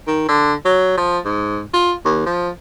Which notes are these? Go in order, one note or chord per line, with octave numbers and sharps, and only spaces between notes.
D#3
D3
F#3
F3
G#2
F4
D#2
F3